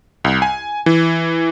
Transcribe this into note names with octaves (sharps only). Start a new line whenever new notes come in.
C2
G#5
E3